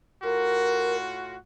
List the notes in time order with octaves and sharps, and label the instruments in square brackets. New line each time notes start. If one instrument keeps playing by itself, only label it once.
[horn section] A2 F4 F#4 [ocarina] A#4